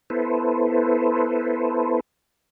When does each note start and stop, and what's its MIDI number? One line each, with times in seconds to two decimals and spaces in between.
0.10 2.00 59
0.10 2.00 64
0.10 2.00 69
0.10 2.00 71
0.10 2.00 72